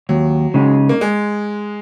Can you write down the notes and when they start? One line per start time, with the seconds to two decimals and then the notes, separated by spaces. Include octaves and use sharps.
0.09 D#2 F#3
0.54 C#3 G#3 D#4
0.89 A#3
1.01 G#3